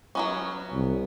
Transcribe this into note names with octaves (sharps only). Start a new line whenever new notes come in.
F#3 B3 C#4
C2